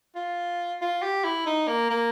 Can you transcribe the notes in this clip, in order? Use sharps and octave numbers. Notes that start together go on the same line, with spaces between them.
F4
F4
G4
E4
D#4
A#3
A#3